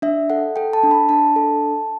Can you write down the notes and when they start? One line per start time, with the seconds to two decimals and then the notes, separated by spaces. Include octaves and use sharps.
0.02 D4 E5
0.30 A4 F#5
0.56 A4 G5
0.73 A5
0.83 D4
0.91 B5
1.09 D4 A5
1.36 A4